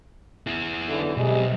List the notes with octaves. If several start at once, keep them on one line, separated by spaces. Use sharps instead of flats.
E4 G#4
B1 D3 E3
B1 C3 G3 G#3